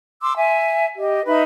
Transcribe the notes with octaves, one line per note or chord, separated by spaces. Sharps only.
C6 D6 E6
E5 G#5
G4 D#5
D#4 B4 E5 B5